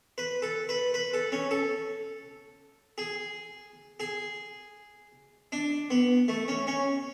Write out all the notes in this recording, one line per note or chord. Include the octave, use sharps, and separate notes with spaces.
B4
A4
B4
B4
A4
C#4
A4
G#4
G#4
D4
B3
A3
C#4
C#4